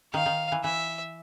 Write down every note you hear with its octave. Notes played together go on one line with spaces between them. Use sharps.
D#3 F5
D#3
E3
E3 E5